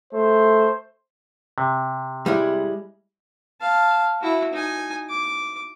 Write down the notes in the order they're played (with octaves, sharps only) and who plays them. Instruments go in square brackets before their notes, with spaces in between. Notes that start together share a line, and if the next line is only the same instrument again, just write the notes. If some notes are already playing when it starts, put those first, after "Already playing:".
[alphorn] A3 [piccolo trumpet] C5
[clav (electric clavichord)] C3
[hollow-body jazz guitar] G3 G#3 E4
[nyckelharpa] F5 A5
E4 F#4
D#4 G#5
D6